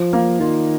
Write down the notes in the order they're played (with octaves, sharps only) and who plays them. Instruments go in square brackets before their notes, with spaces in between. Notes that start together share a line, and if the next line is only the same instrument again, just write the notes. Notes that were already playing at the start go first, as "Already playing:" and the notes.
Already playing: [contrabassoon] F3 [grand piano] C5
[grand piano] A#3
[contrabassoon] D#3 [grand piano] F4